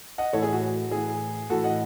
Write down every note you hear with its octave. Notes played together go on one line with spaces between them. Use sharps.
D#5 F#5
A2 E3 A4 C#5
G#4
F#4
A2 E3 G#4
A2 E3 F#4 A4
D#5 F#5